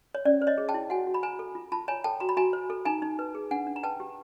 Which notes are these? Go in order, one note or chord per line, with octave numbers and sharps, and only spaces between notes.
C#5
C#4 D5
C5
C#5 D#5
G#4
G5 A5
E4
F#4 F#5 G#5
F#4
B5
C5 G#5 A#5
A4
F4
F4 A5 B5
C#5 G#5 A#5
A4 G5 A5
F#4 A#5
B5
F#4 G#5 A#5
C5
A4
D#4 G#5 A#5
D#4
B4
G#4
D4 F#5 G#5
D4
A#5
B4 G5 A5
G4